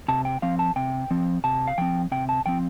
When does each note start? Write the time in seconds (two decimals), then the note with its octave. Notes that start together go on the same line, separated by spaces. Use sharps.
0.08 C3 A5
0.25 G5
0.42 F3 C4 F5
0.59 A5
0.76 C3 G5
1.11 F3 C4
1.44 C3 A5
1.67 F5
1.78 F3 C4 G5
2.12 C3 G5
2.29 A5
2.46 F3 C4 G5